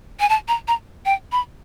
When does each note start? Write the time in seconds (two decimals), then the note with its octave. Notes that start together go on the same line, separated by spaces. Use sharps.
0.20 G#5
0.29 A5
0.48 A#5
0.68 A#5
1.06 G5
1.32 B5